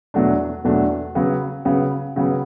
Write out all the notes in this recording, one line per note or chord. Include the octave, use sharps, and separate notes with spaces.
E2 B2 F#3 A3 D4
E2 B2 F#3 A3 D4
C#3 F#3 B3
C#3 F#3 B3
C#3 F#3 B3